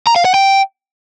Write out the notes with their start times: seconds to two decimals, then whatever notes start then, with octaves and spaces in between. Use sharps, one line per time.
0.07 A#5
0.16 F5
0.25 F#5
0.34 G5